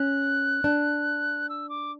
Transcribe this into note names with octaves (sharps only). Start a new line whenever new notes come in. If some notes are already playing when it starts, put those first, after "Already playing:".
Already playing: C#4 F#6
D4
E6
D6